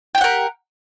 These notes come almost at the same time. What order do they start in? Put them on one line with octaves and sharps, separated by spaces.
G5 G4 F#5 A#4